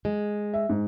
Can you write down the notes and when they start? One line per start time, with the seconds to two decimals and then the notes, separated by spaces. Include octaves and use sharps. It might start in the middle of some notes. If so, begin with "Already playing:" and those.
0.05 G#3
0.54 E5
0.69 G#2